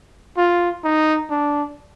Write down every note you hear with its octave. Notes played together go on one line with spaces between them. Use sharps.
F4
D#4
D4